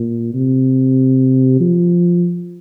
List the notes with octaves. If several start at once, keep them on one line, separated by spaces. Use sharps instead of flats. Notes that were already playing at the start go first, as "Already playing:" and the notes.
Already playing: A#2
C3
F3